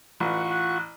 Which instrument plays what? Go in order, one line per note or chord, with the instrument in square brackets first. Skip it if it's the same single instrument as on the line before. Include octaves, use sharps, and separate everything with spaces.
[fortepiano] A1 [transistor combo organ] F4 F#5 C#6 [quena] B4
[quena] F#6